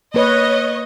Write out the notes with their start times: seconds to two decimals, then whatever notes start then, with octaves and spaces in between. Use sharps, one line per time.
0.14 A#3 B4 C#5 D#5